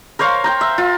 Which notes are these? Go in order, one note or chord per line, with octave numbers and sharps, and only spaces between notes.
A#4 C5 C#5 F5
C5 G5 A#5
E5
F4